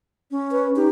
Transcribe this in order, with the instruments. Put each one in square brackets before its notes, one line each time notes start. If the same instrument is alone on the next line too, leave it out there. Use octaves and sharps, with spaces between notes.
[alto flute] C#4
[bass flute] B4
[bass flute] D#4 [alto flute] G4